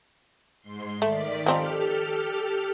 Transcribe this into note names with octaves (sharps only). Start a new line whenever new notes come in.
G#2 C6
D#3 A3 D5 B6
F3 C4 D#4 G4 A4 F6